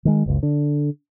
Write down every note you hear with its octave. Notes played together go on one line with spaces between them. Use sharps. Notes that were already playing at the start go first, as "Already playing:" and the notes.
D#3 G#3
F#1 C#2
D3